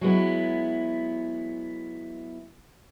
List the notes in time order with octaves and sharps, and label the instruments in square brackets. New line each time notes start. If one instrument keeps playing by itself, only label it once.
[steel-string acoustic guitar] F#3 G#3 B3 E4